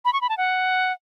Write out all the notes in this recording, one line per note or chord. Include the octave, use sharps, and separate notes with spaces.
B5
C#6
B5
A5
F#5